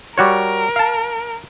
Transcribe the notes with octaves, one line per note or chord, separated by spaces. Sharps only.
G3 F#4 A#4 C#5
F5 A5